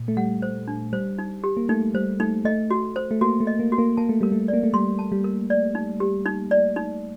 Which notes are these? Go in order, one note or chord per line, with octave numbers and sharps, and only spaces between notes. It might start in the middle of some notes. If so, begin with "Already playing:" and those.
Already playing: A#2
A3
G3 F#5
C5
D4
G3 C5
D#4
G4
A#3
A3 D#4
G3 C5
A3 D#4
A3 D#5
F#4
C5
A3
A#3 F#4
A3
D#5
A#3
F#4
A#3
A#3 A5
A3
G3 A#4
A3
D5
A#3
A3
G3 C6
A5
G3
A#4
D5
D#4
G4
D#4
D5
D#4